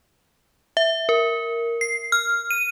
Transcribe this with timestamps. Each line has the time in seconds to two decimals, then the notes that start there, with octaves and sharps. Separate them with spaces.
0.77 E5
1.09 A#4
1.81 C7
2.12 F6
2.51 D#7